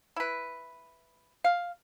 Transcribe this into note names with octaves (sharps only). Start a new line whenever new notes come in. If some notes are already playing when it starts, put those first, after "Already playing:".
E4 B4
F5